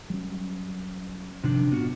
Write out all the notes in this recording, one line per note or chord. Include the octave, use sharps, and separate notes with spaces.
F#3 G3 C#4
G2 C3 D#3 F3 F#3 D4
A2 B3 C4 F4 F#4